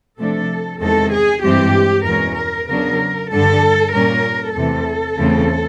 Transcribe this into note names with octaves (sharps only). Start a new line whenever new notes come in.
C3 F3 A3 D4 A4
E2 C3 D#3 G#3 A4
G#4
G2 E3 G#3 C4 G4
E2 B2 G#3 C#4 A#4
A#4
C#3 F#3 B3 D4 A#4
G2 D3 G3 A4
A#2 G3 A#3 C#4 A#4
E2 C3 E3 A3 A4
E2 C#3 E3 A3 C4